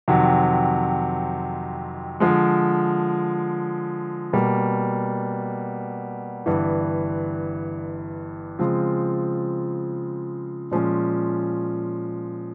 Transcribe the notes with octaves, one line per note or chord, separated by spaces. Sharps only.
F2 C3 D#3 F#3
D3 F3 G#3
B2 G3 A#3
G1 G2 E3
C#3 F3 G#3 C4 F4
A#2 F3 G#3 C#4